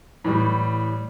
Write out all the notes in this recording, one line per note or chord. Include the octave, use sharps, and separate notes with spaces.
A2 E3 G3